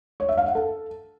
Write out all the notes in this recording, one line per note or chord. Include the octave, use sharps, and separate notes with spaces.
C#5
E5
F5
F#5
A4